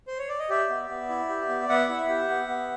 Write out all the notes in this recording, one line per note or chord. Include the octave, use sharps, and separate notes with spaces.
C5
C#5
D5
D#5
G4 D5 E5
B3
B3
E4
G4
B3
B3 E5 F#5
E4
G4
B3
B3